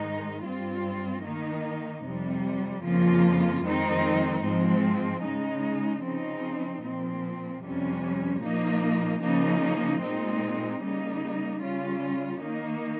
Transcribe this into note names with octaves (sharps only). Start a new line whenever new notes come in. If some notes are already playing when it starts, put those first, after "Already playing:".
Already playing: G#2 D#3 G#3 D#4
G2 G3 C4 F4
D#3 A#3 D#4
F2 C3 G3
F2 C#3 F3 A#3 F4
F2 D#3 G#3 C4 D#4
G#2 F3 G#3 C4
C#3 G#3 D#4
C#3 F3 C4 D#4
A#2 F3 C4
F2 C3 G3 C#4
A#2 F3 A#3 D#4
C#3 F3 A#3 D#4
A#2 G#3 C4 D#4
C#3 G3 A#3 D#4
C#3 G3 C#4 F4
D#3 A#3 D#4